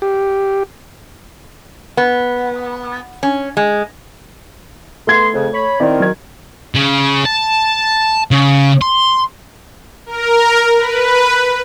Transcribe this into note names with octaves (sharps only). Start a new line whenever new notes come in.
G4
B3
C#4
G#3
A3 B3 C6 G#6
F2 C#3
C#5 B5
D#3 C4 E4 D5
F#3 G#6
C#3
A5
C#3
C6
A#4
B4